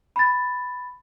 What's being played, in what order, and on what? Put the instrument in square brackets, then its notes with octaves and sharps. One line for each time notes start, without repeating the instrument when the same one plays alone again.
[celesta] B5 A6